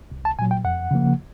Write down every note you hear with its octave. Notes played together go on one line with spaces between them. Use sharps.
C2
A5
A#2 F#3 G#5
G5
F2 F#5
C#3 F3 A#3